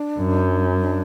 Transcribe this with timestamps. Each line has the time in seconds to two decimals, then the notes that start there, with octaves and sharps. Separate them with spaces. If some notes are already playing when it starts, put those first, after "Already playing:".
Already playing: D4
0.19 F#2
0.80 D4